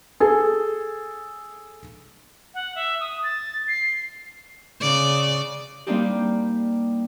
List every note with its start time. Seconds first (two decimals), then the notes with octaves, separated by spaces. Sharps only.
0.20 G#4 A4
2.54 F#5
2.75 E5
3.00 D#6
3.23 A6
3.68 C7
4.81 C#3 D5
5.87 G3 A#3 C4 D4 D#4 G4